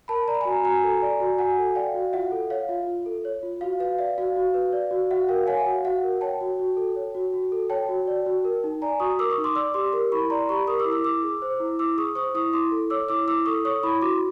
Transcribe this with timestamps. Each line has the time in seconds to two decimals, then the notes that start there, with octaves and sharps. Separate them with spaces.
0.08 A#4 A5 B5
0.28 D5 A#5
0.35 B5
0.41 F#4 G#5 A#5
0.64 F#4 G#5 A#5
0.83 A4
1.02 D5
1.20 F#4
1.38 F#4 F#5 G#5
1.58 A4
1.75 D5 F5 G5
1.95 F#4
2.13 F4 E5 F#5
2.32 A4
2.50 C#5 F5
2.69 F4 E5
2.87 F4
3.06 A4
3.25 C#5
3.43 F4
3.61 F#4 F5
3.80 B4 F5
3.99 D5 E5
4.18 F#4 F5
4.36 F#4
4.54 B4
4.73 D5
4.91 F#4
5.11 F#4 E5 F#5
5.28 A#4 F5 G5
5.47 C#5 F#5 G#5
5.60 E5
5.66 F#4 F5
5.85 F#4 E5 F#5
6.03 A#4
6.21 C#5 G5 A5
6.41 F#4
6.59 F#4
6.77 A4
6.96 C#5
7.15 F#4
7.34 F#4
7.52 A4
7.70 C#5 G5 A5
7.89 F#4
8.07 D5
8.26 F#4
8.45 A#4
8.64 D#4
8.82 D5 G#5 A#5
9.00 F#4 C#6 D#6
9.19 A#4 D6 E6
9.31 C#6 D#6
9.38 D#4
9.44 C6 D6
9.55 D5 D6 E6
9.74 G4 C6 D6
9.93 A#4
10.12 E4 B5 C#6
10.30 D5 A#5 C6
10.49 G4 B5 C#6
10.67 A#4 C#6 D#6
10.79 D6 E6
10.85 E4
10.92 D6 E6
11.04 E4 D6 E6
11.23 G#4
11.42 C5
11.60 E4
11.79 E4 D6 E6
11.97 G#4 C#6 D#6
12.15 C5 C#6 D#6
12.34 E4 C#6 D#6
12.53 E4 C6 D6
12.71 A4
12.90 C#5 D6 E6
13.09 E4 D6 E6
13.27 E4 D6 E6
13.45 A4 C#6 D#6
13.65 C#5 C#6 D#6
13.83 E4 B5 C#6
14.02 F#4 C6 D6